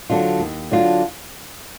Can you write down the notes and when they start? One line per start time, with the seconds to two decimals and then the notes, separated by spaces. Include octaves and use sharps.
0.10 D3 F#3 D4 F4
0.40 D#2
0.71 D3 F#3 D4 F4